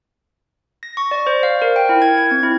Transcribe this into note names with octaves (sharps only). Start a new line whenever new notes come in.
A#6
C#6
D5
C5
F5
A#4
G5
E4
G#6
G#6
C4
E4